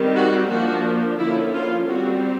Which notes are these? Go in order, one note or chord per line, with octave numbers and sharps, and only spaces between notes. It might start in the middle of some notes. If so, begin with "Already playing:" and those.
Already playing: D#3 G3 C4
F#4
F3 A#3 D4 F#4
D3 F3 A#3 C#4 E4
F4
G3 C4 F#4